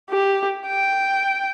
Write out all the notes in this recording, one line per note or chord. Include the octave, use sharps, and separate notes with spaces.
G4
G5